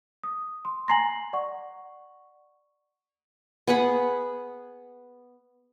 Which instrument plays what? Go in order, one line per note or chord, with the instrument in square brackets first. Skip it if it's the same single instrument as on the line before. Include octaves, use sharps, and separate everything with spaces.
[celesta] D#6
C6
[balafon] G#5 A#5 C6 [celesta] A#6 C7 F#7
[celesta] D5 F#5 C#6
[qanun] B3 G#4 F#5 B5